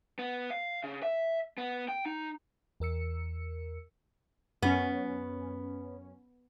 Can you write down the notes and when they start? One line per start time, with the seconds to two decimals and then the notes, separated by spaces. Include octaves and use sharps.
0.19 B3
0.51 F5
0.84 C#3
1.03 E5
1.58 B3
1.88 G5
2.06 D#4
2.80 E2 A#4 E6 C#7
4.62 F#2 B3 C#4